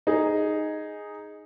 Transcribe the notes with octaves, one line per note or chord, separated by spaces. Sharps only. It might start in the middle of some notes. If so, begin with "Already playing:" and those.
D#4 G#4